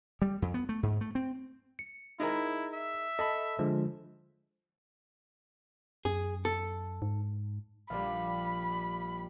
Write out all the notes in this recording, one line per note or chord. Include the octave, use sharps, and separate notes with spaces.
G3
F2
B3
A3
G#2
A3
C4
C#7
D#4 E4 G#4 A#4
E5
A4 D#5 A5 B5
D3 F3 G#3
F#2 G#4
A4
G#2
A#1 G3 G4 D5 F5 B5